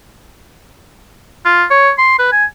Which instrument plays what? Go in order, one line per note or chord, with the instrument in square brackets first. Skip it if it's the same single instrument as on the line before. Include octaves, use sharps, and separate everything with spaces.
[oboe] F4
C#5
C6
B4
G#5